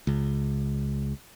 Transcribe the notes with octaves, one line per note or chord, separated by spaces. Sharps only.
C#2